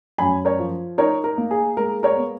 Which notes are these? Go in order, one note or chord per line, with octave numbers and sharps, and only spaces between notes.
F#2 G#5 B5
A#4 C#5
F3
D#4 A#4 C#5
A#4
A#3
G#4
G#3 A#4
A#4 C#5
B3